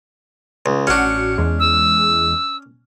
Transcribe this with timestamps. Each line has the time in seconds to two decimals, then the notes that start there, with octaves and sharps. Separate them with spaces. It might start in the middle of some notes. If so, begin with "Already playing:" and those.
0.66 C#2
0.87 A1 C#4 D4 F#4 C#7
1.38 E2 G#3
1.60 E6